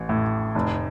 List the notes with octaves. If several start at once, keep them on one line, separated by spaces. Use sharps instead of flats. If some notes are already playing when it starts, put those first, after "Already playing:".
Already playing: A1
A2
F1